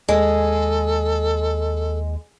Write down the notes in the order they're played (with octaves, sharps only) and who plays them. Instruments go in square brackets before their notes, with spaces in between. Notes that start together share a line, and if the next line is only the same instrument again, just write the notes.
[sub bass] D#2 [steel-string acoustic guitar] G#3 [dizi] A4